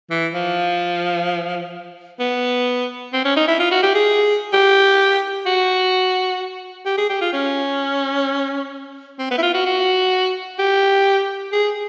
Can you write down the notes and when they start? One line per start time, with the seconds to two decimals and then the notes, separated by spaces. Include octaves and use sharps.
0.10 E3
0.34 F3
2.20 B3
3.13 C4
3.25 C#4
3.37 D#4
3.48 E4
3.60 F4
3.71 F#4
3.83 G4
3.95 G#4
4.53 G4
5.46 F#4
6.86 G4
6.98 G#4
7.10 G4
7.21 F4
7.33 C#4
9.19 C4
9.31 B3
9.38 E4
9.43 F4
9.54 F#4
9.66 F#4
10.59 G4
11.53 G#4